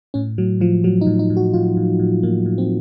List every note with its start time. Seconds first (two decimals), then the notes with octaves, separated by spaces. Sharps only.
0.14 A2 C#4
0.38 A2 F#3
0.60 A2 F3
0.84 A2 F#3
1.01 D#4
1.07 A2
1.19 D#4
1.30 A2
1.37 F#4
1.53 A2 F4
1.77 A2
1.99 A2
2.23 A2 A#3
2.46 A2
2.58 C4